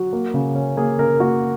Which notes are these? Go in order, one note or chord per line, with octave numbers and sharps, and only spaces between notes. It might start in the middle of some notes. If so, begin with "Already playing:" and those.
Already playing: F#3 F#4
A#3
C#3
C#4
A#3 G#4
C#3 A#4
A#3 F#4